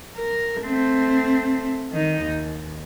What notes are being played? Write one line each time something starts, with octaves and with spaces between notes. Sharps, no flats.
A#4
A3 C4
D#3 D#4
D#2